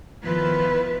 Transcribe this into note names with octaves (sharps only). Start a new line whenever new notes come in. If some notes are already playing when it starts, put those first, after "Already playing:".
D#3 F3 B3 E4 F4 B4